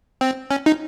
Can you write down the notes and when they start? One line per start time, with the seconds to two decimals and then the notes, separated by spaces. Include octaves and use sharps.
0.21 C4
0.51 C#4
0.66 D#4